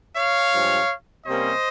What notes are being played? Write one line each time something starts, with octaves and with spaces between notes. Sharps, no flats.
C#5 F5
G2 F3 G#3
C3 G3 A#3 C#4 C5 D#5